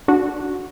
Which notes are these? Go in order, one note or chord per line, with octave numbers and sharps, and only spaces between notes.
D4 F#4